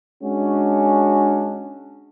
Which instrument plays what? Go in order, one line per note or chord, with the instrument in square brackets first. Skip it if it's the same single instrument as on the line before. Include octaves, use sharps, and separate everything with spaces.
[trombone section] G#3 C#4 D4 F#4